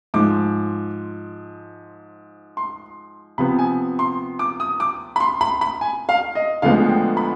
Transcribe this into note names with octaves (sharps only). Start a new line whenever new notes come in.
G#2 F3 G#3 D6
C6
C3 F3 B3 B5
G#5
C6
D6
D#6
D6
B5
C6
B5
B5
G#5
F5
D#5
D2 D3 F3 G#3 B3 F5
G5
B5